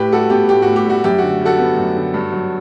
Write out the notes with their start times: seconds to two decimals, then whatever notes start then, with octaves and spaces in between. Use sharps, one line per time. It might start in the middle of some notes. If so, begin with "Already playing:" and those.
Already playing: A2 G4 B4
0.12 G3 F#4 A4
0.30 B3 G4
0.49 A2 G4
0.62 F#4
0.67 A2
0.76 G4
0.86 G3 F#4
1.04 F#2 G4
1.18 D3 F#4
1.41 G3 F#4 A4
1.58 B3
1.77 F#2
1.96 D3
2.14 G2
2.32 F#3